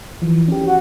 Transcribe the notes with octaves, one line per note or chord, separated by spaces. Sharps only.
E3 F3
C#4 G4
F#4